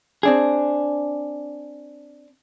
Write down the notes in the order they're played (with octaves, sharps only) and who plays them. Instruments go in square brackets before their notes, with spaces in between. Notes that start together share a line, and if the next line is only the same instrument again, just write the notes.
[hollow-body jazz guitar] C4 D4 G#4